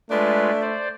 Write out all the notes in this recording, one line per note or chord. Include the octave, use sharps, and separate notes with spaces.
G#3 A3 D4 F4 B4
C5 D5